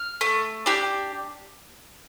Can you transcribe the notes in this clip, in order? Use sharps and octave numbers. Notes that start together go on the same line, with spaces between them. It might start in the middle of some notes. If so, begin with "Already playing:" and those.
Already playing: F6
A3
D4 G4